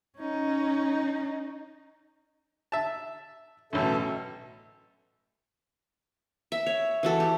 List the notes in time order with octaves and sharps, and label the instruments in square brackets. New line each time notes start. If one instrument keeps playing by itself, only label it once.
[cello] C#4 D#4
[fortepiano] E5 A5
[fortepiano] A1 F#2 [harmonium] B2 A4 E5
[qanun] E5
C#5
E3 F#4 A4
G4